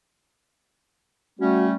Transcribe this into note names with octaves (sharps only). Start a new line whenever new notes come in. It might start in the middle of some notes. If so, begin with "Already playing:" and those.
G3 A3 C#4 F#4